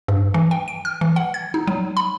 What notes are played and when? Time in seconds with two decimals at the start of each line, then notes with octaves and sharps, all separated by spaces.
0.08 G2
0.34 E3
0.51 G5
0.68 D7
0.85 F6
1.01 E3
1.16 F#5
1.34 G#6
1.54 D#4
1.68 F#3
1.97 B5